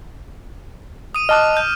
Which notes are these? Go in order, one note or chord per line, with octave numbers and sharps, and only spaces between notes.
D#6 D#7
D#5 A5 D6 D#6 F6 F#6
G6